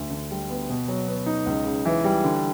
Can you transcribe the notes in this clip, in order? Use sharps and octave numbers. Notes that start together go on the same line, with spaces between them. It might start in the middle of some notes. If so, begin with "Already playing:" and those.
Already playing: D2
D3
G3
B3
B2
F#3
B3
D#4
C#2
C#3
E3
G3
D3